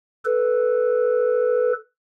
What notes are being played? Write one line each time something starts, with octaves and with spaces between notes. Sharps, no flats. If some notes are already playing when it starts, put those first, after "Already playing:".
A4 B4